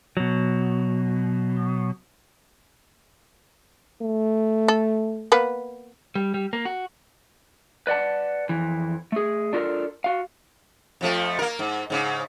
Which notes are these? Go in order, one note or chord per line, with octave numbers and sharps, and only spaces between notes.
B2 F#3
A3
A4
A#3 B3 B4
G3
G3
A#3
F#4
B4 D5 F#5 A5
F2 E3
A3 G#4
D4 F4 F#4 A4 A#4
F#4 F5
F2 F3 A3
A#3 A#4
G#2
G#2 C#3